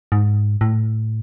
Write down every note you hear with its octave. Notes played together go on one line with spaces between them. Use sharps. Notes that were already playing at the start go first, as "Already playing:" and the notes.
G#2
A2